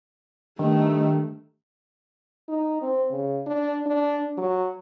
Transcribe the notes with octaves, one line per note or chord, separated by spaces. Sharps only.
G2 D#3 A3
D#4
C4
C#3
D4
D4
F#3